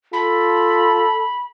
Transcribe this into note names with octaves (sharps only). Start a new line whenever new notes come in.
F4 A4 B5